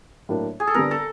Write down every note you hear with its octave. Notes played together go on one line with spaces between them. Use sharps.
A2 F#3 A#3 D4
G#4
A4
D3 G3 B3 A#4
A4